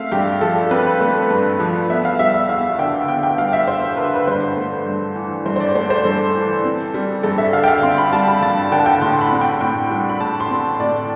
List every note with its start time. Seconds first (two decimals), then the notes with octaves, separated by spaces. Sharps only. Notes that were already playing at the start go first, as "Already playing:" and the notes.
Already playing: A3 C4 E5 F5
0.12 G2 G4
0.41 F3 A4
0.71 C4 B4
1.01 A3
1.30 G2
1.60 F3
1.90 B3 E5
2.05 F5
2.19 G3 E5
2.34 E5
2.49 E2 F5
2.79 D3 G5
3.08 B3 G5
3.23 G5
3.38 G3 F5
3.53 E5
3.67 E2 C5
3.97 D3 B4
4.16 B4
4.27 G2 C5
4.57 A3
4.86 G2
5.16 E3
5.46 G2 C5
5.56 C5
5.60 D5
5.75 A3 C5
5.90 C5
6.05 G2 A4
6.35 E3
6.64 C4
6.94 G3
7.23 G2 A4
7.38 E5
7.53 D3 F5
7.64 G5
7.68 F5
7.83 C4 C6
7.98 B5
8.13 G3 A5
8.28 B5
8.42 G2 A5
8.72 D3 G5
8.79 A5
8.86 G5
9.01 A2 C6
9.21 B5
9.32 C4
9.41 G5
9.61 A2 G5
9.91 G3
10.09 B5
10.20 A2 A5
10.40 C6
10.50 C4
10.80 A2 D5